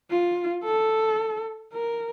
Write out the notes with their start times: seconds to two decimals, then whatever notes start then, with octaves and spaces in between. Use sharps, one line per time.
0.10 F4
0.65 A4
1.73 A#4